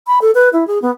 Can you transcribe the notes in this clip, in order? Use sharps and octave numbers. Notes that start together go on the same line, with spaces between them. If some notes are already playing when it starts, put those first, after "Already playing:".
B5
A4
B4
E4
G#4
B3